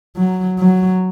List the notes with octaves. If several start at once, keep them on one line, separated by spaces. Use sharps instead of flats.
F#3
F#3